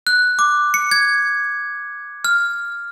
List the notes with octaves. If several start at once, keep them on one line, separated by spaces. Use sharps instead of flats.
F#6
D6
C#7
G#6
F6